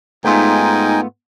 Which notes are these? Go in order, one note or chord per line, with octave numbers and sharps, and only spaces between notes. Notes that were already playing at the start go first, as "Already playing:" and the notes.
G#2 A3 B3 D#4 F4 G5 G#5